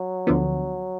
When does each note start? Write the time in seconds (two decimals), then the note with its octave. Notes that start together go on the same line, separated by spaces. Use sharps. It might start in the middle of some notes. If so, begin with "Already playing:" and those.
Already playing: F#3
0.27 D2 D3 F3 B3